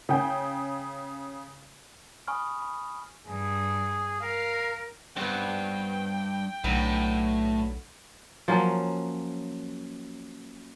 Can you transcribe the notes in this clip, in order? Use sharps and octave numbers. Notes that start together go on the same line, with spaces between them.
C#3 G5 G#5
G#5 B5 C#6 D#6 F6
B5
G2 G#4
A#4 F5
G2 B3 C4 G5
B1 A2 D3 F#3 B3
F3 F#3 A#3 C#4